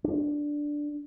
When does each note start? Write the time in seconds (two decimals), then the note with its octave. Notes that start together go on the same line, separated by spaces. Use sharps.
0.04 D4